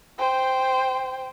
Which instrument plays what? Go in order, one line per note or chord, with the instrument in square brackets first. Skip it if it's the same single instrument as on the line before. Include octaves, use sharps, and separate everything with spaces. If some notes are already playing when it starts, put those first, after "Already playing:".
[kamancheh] C5 G5